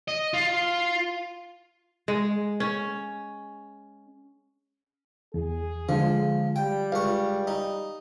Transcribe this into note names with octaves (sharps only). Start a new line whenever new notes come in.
D#5
F4
G#3
C#4
E2 G#4
D3 F3 G#3
G3 G5
C#2 F5 C#6
D#4